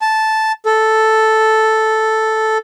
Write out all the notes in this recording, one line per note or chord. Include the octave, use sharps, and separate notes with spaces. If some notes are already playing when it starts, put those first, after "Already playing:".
A5
A4